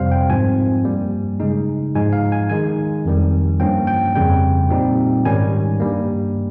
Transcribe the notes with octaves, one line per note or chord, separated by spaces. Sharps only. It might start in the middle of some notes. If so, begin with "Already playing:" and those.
Already playing: F2 C3 G3 C5 F5
G5
G#2 F3 C4 G#5
G2 G3 A#3
C#3 G#3 D#4
G#2 F3 G#3 D#4 G#5
F5
G#5
D#3 G#3 D#4 G#5
F2 D#3 G3
G2 F3 A#3 C#4 G5
G5
F2 C#3 G3 G5
A#2 G3 C4 D#4
G#2 D#3 G3 C#4 G#5
G2 G3 A#3